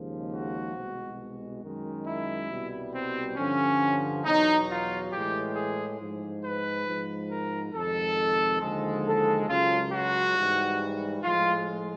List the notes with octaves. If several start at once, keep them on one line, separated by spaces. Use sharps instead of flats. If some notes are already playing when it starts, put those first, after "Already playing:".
Already playing: D#2 C#3 F3 G#3
F#4
C2 B2 G#3
F#2 D#3 G#3
E4
C2 B2 G3
C4
G2 D3 F3 C#4
E2 B2 F#3 D#4
F4
A2 E3 G#3 G4
G#4
G#2 F3 G#3
B4
G#2 F3 G#3
A#4
F2 C3 D#3 G#3 A4
D#2 D3 F3 G#3
A4
C#2 C#3 F#3 F4
F#4
G#2 E3 G3
A2 F3 G#3 F4